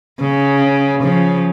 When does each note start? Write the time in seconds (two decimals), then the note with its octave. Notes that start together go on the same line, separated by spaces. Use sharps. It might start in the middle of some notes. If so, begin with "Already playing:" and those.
0.21 C#3
1.03 C#3 F3